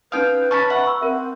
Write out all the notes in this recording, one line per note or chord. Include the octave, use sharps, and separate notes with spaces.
C#4 D#4 B4 F5 G5 D#6
C#4 A5 B5 C#6
E5 F#5 C#6
B5 C#6 E6
C4 A#4 E5